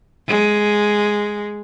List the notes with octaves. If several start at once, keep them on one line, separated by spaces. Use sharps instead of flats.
G#3